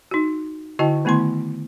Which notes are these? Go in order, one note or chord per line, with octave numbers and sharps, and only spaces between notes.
D#4 F#4
D3 E4 F#4 D#5 G5 A5
D#3 A3 B3 E4 C6